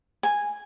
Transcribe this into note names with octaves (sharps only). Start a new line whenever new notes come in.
G#5